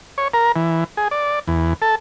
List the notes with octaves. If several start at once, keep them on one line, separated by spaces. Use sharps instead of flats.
C#5
A#4
E3
G#4
D5
E2
A4